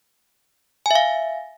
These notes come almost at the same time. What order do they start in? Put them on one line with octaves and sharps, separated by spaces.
G#5 E5 F5